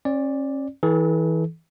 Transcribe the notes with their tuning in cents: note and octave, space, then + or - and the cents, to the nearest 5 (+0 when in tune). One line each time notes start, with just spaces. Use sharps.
C#4 -35 D5 +0
E3 -25 A4 -45